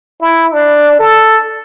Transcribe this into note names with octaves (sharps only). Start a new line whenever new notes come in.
E4
D4
A4